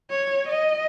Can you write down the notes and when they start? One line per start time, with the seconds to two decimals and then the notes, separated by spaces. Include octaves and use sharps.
0.10 C#5
0.49 D#5